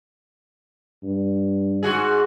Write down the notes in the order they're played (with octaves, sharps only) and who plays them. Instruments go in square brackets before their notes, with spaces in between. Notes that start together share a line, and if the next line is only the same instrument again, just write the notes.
[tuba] G2
[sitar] G#2 F#4 G#4